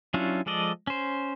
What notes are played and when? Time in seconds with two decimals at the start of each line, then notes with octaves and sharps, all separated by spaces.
0.14 F#3 C#4 D4 E4 F4
0.46 F3 G#3 A4 D5 D#5
0.87 C#4 C5